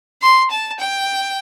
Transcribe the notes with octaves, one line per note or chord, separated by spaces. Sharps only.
C6
A5
G5